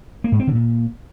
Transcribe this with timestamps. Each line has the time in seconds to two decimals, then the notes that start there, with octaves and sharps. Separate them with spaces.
0.24 A#3
0.32 G#2
0.40 C4
0.47 D3
0.55 A#2